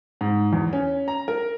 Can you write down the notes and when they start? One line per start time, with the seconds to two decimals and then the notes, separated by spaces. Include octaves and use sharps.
0.21 G#2
0.53 E2
0.73 C#4
1.08 A#5
1.28 A#4